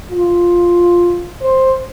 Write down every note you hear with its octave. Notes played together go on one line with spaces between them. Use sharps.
F4
C5